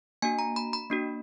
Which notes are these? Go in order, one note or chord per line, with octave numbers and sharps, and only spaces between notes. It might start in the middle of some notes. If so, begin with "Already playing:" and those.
A#3 D4 F#4 G#5
A#5
B5
B5
A#3 D4 F#4